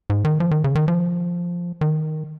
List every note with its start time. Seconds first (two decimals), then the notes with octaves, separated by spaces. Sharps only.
0.10 G#2
0.25 D#3
0.40 F3
0.51 D#3
0.64 C#3
0.75 D#3
0.88 F3
1.81 D#3